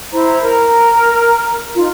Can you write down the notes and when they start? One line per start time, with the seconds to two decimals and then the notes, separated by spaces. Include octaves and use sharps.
0.13 E4 C5 A#5
0.41 A#4 A#5
1.75 D#4 F4